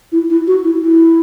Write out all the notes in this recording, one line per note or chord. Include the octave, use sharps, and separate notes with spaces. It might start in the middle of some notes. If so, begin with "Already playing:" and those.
E4
E4
F#4
E4
E4